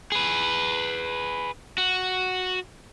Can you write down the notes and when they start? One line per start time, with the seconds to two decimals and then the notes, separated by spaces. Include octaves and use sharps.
0.12 G#4 B4
1.78 F#4